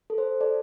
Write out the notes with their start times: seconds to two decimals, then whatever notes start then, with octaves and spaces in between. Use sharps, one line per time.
0.10 A4
0.18 C5
0.41 A4 D5